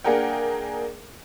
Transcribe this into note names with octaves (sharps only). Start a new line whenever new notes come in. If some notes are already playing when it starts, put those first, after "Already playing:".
A#3 D4 G#4 A#4 F#5 G5